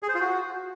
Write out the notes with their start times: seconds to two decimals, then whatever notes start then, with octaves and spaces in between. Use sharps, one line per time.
0.03 G#4
0.09 C5
0.15 F4
0.21 F#4